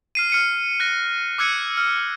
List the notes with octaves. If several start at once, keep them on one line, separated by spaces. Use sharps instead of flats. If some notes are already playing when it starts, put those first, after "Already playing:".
F6 C7 D#7
F6 C#7 D#7
F#6 A#6
D6 E6 F#6 G#6 C#7 D#7
F6